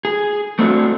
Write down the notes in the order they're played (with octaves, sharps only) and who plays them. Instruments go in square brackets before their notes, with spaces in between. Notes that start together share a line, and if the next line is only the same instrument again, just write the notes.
[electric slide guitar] G#4
A3 C4 D4 F#4